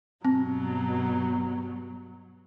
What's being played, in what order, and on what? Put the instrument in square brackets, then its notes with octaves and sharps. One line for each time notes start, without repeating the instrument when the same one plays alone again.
[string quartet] G2 B2 F#3 [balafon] C4